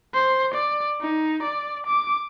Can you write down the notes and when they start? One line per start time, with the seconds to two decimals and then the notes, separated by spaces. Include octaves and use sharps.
0.14 C5
0.54 D5
1.01 D#4
1.43 D5
1.87 D6